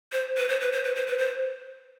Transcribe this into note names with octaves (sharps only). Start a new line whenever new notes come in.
C5
B4
C5
B4
C5
B4
C5
B4
C5